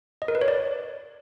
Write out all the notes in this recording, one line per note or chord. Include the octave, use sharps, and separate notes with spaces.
D#5
A#4
B4
C#5
D5